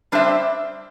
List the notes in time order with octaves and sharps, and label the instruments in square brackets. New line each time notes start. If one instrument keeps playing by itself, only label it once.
[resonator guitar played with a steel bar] G3 D4 C5 E5